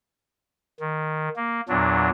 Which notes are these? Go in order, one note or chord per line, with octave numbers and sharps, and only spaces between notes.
D#3
A#3
E2 A#2 F#3 D4